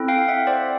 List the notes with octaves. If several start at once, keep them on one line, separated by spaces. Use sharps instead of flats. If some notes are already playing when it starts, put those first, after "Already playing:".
Already playing: C4 E4 A4
F5 G5
G5
E5 F#5
C5 D5